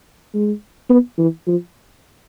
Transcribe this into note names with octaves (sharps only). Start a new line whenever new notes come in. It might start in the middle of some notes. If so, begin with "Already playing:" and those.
G#3
B3
E3
F3